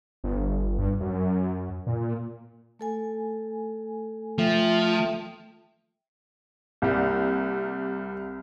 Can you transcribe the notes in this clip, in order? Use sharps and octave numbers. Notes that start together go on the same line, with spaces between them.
G1
G2
F#2
A#2
A3 A4 G#5
F3 A3 E5 G5
C2 G3 A#3